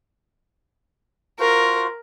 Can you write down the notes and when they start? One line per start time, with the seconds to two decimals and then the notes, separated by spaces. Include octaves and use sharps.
1.39 F4 F#4 A#4 C5